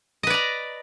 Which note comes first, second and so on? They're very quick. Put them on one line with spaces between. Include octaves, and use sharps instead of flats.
D#5 B4 D5 A#5